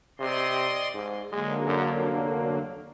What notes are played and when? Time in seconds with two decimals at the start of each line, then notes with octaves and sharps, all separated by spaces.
0.19 C3 D5 D#5 C6
0.94 G#2
1.32 D3 F#3 G#3 A#3
1.66 F#2
1.96 F1